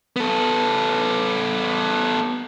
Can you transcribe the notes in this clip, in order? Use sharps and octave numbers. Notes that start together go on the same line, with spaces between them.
B3 A4